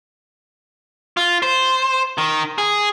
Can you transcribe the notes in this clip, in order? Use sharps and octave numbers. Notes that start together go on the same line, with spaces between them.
F4
C5
D#3
G#4